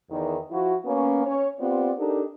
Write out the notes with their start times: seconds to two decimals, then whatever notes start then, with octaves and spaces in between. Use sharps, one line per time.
0.10 E2 D#3
0.51 F3 E4 F#4
0.85 A#3 B3 C#4
1.26 C#4 C#5
1.59 B3 C4 F4 G4 D5
1.98 D4 D#4 G4 A4 A#4